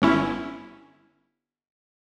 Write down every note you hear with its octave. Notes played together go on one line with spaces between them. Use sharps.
G1 C#4 E4